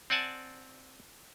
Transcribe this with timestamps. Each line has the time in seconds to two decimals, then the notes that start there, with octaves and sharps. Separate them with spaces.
0.10 C4 D5 F#5 G#5 A5